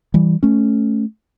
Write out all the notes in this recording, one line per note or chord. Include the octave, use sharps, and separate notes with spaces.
E3 G3
A3 C#4